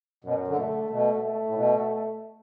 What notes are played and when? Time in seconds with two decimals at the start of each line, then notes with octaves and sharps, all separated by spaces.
0.24 F#2 B2
0.47 D3
0.57 B2 A3
0.74 D3
0.89 B2 A3
1.22 A3
1.46 A2
1.55 B2